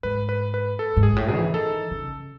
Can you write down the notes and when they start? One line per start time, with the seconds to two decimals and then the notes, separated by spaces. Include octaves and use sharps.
0.03 G#2 B4
0.29 B4
0.54 B4
0.79 A4
0.97 G#2
1.03 G#4
1.16 A2
1.28 G#4
1.35 E3
1.54 D#3 A4
1.91 C#3